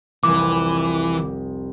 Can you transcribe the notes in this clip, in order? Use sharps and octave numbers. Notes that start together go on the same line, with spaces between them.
F1 C2 E3 D6